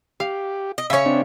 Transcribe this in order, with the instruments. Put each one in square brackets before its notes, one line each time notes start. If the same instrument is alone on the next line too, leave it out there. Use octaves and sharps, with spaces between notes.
[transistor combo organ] G4 [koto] F5
[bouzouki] D#5
[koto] C#3 C#4 [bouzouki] C#5 E5
[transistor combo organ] C4 D4